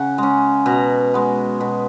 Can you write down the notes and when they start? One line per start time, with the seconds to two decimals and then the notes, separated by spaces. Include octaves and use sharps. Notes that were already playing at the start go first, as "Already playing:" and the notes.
Already playing: C#3 F#5
0.18 G#3 C#4 A#5
0.66 B2 A#5
1.14 G#3 B3
1.61 B2